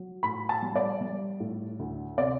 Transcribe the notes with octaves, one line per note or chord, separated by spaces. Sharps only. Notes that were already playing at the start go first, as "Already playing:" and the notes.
Already playing: F#3
A2 B5
A5
G3
D5
G3
A2
D2
C3 D5